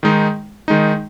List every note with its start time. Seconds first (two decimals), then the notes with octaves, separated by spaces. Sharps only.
0.03 D#3 G#3 D#4
0.68 D#3 G#3 D#4